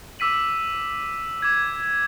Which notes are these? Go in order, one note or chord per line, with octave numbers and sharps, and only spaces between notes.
D6 E6 B6 D#7 F#7
D6 G#6